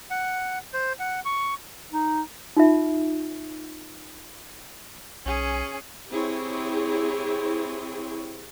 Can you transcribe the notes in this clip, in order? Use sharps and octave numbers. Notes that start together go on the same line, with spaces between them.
F#5
C5
F#5
C#6
D#4
D#4 F4 E5
B1 C#4 G#4
C4 E4 G4 G#4 C#5